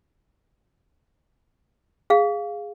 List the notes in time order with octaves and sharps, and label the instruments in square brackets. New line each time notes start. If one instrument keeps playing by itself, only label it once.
[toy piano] G#4 F5